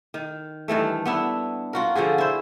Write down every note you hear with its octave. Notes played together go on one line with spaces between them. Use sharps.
D#3
G2 D#3 E3 A3
B3 D4 E4
F4 F#4 A#4
D3 F3 F#4 G#4
E4 C5